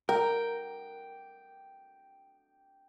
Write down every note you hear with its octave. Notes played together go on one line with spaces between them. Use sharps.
A#4 G5